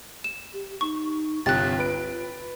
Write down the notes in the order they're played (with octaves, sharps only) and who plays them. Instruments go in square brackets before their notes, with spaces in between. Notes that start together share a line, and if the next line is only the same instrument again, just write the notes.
[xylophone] E7
[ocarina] G4
[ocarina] D#4 [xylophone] C#6
[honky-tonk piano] G1 C2 G4 [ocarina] F4 [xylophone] F#6 A6
[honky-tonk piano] B4 D7